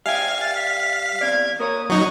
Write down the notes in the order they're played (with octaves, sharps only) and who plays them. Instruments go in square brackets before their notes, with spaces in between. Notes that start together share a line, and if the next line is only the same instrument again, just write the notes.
[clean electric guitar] G3 E5 G5 [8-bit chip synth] F5 [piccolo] G#5
[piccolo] A6
B6
[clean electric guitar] E2 C4 D5 [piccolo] G#6
[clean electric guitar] A#3 A#4 C#5 [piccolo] D#6
[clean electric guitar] C#3 [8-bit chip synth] F#3 D#4 [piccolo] C#6